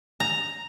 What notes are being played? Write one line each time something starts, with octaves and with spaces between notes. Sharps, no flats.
A#5